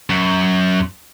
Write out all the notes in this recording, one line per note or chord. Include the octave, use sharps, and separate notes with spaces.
F#2